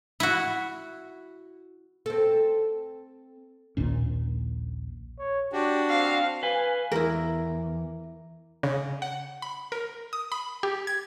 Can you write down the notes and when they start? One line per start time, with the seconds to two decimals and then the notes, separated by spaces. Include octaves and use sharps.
0.20 E4 F#4
2.06 C4 A4
3.77 A#1 D#2 A#2 C#4
5.19 C#5
5.53 D4 F#4 G4
5.89 C4 F5
6.43 B4 F5 G#5
6.92 E2 E4 A#4
8.63 C#3
9.02 F#5
9.42 B5
9.72 A#4
10.13 D#6
10.32 B5
10.63 G4
10.87 G#6